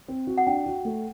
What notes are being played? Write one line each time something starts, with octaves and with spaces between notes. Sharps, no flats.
C4
F#4
F#5
D4 G5
F#4
A3